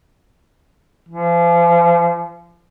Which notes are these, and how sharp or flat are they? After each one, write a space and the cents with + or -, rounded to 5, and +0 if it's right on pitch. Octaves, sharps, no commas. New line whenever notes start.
F3 -35